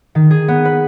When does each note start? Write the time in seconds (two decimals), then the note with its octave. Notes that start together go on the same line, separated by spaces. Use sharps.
0.15 D#3
0.31 G#4
0.48 B3
0.65 B4